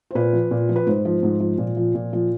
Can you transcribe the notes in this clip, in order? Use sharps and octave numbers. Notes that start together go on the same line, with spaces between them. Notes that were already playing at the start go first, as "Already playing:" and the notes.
C5
A#2 B4
F3
A#2
F3
B4
G#2 C5
F3
G#2
F3
A#2
F3
A#2
F3